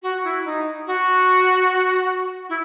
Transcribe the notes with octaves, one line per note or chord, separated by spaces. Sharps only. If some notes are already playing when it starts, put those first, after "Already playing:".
F#4
E4
D#4
F#4
E4